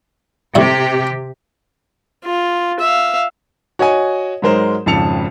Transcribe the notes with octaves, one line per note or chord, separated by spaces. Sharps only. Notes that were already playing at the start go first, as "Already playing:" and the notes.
A2 C3 G3 G4
F4
E5 F5
F#4 C#5 D#5 G#5
G#2 F#3 G#3 A#4 C5
G#1 F2 C#3 A5 C#7 F7